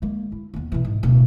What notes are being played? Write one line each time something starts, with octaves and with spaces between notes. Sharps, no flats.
G#3 A#3
E4
D#2 B3
C3 E3
G#2
D1 B2